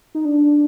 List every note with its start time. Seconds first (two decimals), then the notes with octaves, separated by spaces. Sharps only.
0.15 D#4
0.25 D4